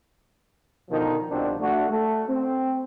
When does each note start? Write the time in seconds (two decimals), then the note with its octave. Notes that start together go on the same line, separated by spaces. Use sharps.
0.90 B2 D3 D#3 F3 D#4 A#4
1.30 C2 B2 F3 C4 D4
1.60 A3 D4 F#4
1.89 A3
2.28 C4